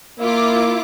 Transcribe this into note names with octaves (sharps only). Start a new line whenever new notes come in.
A#3 E4 F4 D6